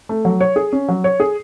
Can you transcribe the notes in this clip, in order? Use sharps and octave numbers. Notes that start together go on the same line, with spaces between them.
A3
F#3
C#5
G#4
C#4
F#3
C#5
G#4